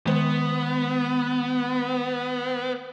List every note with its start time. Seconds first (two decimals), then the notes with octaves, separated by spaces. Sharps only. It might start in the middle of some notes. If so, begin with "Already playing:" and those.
0.07 D#3 G#3 B3 C5